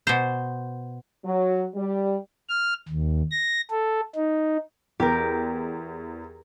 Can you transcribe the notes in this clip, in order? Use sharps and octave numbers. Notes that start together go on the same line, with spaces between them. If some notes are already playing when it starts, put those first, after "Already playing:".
B2 C5
F#3
G3
F6
D#2
A#6
A4
D#4
E2 G4 A#4